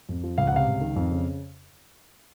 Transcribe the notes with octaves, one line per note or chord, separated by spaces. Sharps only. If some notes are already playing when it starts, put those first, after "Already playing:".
F2
F3
C#2 F5
F#5
C3 F5
C#2
D#3
F2
C#3